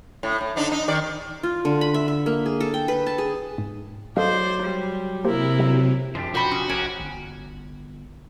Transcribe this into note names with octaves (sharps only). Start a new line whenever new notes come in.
A2
A2
D3 D4 D#4
D#4
D#3 D5
F4
D3
B5
E5
E5
A#3
G#4
A4
G5
B4
A5
G#4
G#2
F#3 A4 C5 D5 D#5 F5
G3
C3 A#3 E4 G4 A#4 C5
F#3
F#2 F3 D4 G4
B2 F#4 C5 B5
C#4 D#6
A#1 C#4 G4 A#4 G#5
G1